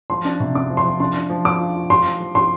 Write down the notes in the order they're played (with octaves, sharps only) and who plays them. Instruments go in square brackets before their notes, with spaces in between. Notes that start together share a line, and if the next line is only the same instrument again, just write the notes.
[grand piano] F3 [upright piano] C6
[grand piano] D4
C3
[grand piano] D4 [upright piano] D6
[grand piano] F3
[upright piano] C6
[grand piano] F3
[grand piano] D4 [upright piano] C6
[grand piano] D4
F3
[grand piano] D4 [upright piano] D6
[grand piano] F4
F4
[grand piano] G4 [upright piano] C6
[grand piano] F3
F3
[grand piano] G4 [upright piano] C6